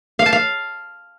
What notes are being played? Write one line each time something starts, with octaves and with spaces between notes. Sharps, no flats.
F5
A5
F5